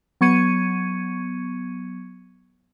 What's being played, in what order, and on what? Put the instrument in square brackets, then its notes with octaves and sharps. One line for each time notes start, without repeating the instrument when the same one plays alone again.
[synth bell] F#3 B3 C#6 G#6 C#7 D#7